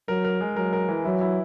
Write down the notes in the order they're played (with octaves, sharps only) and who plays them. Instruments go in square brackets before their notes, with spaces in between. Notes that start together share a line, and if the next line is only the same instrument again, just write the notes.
[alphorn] F#3 [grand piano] A#4
[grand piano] A#4
G#3
[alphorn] F#3 [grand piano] A#4
[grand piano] A#4
E3
[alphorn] F#3 [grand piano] E4
[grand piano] E4